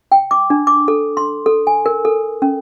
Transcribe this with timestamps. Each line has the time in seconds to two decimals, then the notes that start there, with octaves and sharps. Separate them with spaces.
0.12 G5
0.31 D6
0.50 D4
0.67 D6
0.88 A4
1.17 C6
1.46 A4
1.67 G#5
1.86 A#4
2.05 A4
2.42 C#4